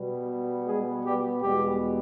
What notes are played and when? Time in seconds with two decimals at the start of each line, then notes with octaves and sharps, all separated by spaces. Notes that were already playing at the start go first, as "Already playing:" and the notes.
Already playing: B2 G3 B3
0.66 G#3 G#4
1.04 G3 G4
1.41 E2 B2 G3 G#3 B3 G4